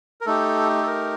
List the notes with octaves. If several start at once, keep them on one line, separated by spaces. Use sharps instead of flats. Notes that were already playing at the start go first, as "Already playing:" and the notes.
A#4
A3 D#4 G4 A4
A4
A#4